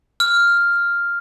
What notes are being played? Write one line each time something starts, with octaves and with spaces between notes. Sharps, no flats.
F6